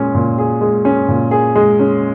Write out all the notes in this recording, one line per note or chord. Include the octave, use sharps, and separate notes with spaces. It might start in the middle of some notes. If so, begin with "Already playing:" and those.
Already playing: A#2 G#3 C#4
A#2
G#4
G#3
C#4
A#2
G#4
G#3
C#4